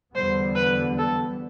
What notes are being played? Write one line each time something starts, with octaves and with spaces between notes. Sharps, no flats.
E2 D3 G3 B3 C5
B4
A4